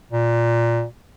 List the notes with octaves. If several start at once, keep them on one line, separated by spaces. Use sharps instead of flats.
A#2